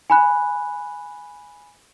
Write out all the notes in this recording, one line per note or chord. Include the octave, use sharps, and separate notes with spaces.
G#5 B5 F#6